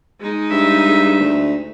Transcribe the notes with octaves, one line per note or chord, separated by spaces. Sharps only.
G#3 D#4
G2 E5
D2